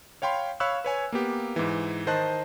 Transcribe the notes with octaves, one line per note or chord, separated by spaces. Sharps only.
C#5 F5 G5 B5 C6
C#5 F5 B5 C#6 E6 F#6
B4 C#5 G#5
A#3 B3 G4
G#2 E3
D#3 C5 D#5 A5 F#6